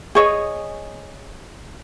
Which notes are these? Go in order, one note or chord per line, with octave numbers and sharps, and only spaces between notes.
G#4 C#5 D#5